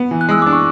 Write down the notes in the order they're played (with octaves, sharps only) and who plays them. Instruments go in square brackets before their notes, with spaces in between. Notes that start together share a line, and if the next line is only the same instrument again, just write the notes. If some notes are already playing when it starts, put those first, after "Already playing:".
Already playing: [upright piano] B3
E3
[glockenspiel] F#6
[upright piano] G#3 [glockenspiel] E6
[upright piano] D4 [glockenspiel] D6
[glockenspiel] C#6